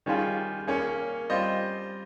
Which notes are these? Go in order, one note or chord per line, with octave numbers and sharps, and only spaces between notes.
D#3 G3 C#4 F4 G#4
A#3 C#4 G#4 C#5
G3 C4 F4 C5 D#5